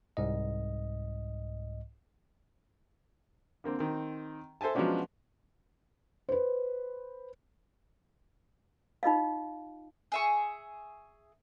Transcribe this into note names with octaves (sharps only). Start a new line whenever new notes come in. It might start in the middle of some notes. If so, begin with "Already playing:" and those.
C2 G#2 D#5
D3 A#3 C4
D#3 C4
A4 C5 E5 G#5 A5
F3 F#3 G#3 B3 C#4 D4
B4 C5
D#4 F4 D#5 F5
G#4 E5 C#6